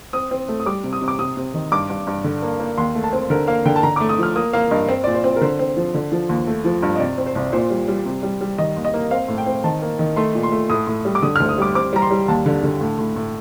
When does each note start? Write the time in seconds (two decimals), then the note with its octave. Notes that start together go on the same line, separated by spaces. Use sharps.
0.13 C4 D#6
0.31 C4
0.49 A3
0.60 D#6
0.66 G3 D6
0.84 C3
0.93 D#6
1.02 C3
1.08 D6
1.19 C3 D#6
1.37 C3
1.54 D#3
1.72 G2 D6
1.89 G2
2.07 G2
2.24 D3
2.42 A#3
2.60 A#3
2.77 D#2 C6
2.95 A3
3.04 A5
3.13 C4
3.30 D3 A#4
3.47 A#3 F5
3.65 D3 G5
3.76 A5
3.83 D3 A#5
3.96 A3 D6
4.09 D#6
4.18 F3 F6
4.36 A#3 D#6
4.53 A#3 F5
4.71 G2 D#5
4.88 C4 C5
5.04 A#2 D5
5.14 C5
5.24 C4
5.36 A#4
5.41 D3 C5
5.59 C4
5.77 F3
5.94 D3
6.12 F3
6.29 D#2
6.47 A3
6.65 F3
6.83 G2
6.95 D#5
7.00 C3 D5
7.18 C4
7.26 C5
7.35 C2
7.53 A#2 C5
7.70 G3
7.88 G3
8.06 C3
8.23 G3
8.41 G3
8.58 D#3 D#5
8.77 D#2
8.85 D#5
8.94 A#3
9.11 C4 F5
9.28 A2
9.38 G5
9.46 C4
9.64 D#3 A5
9.82 A#3
9.99 D#3
10.16 A3 C6
10.35 A#2
10.43 C6
10.52 A3
10.70 A2 D#6
10.87 A2
11.05 G3
11.15 D6
11.22 D3 D#6
11.36 F6
11.40 D2
11.49 D#6
11.58 G3 D6
11.75 C4 D6
11.93 G3 A#5
12.02 C6
12.11 G3
12.28 D#2 A5
12.46 D3
12.63 D3
12.81 A2
12.99 A2
13.16 A2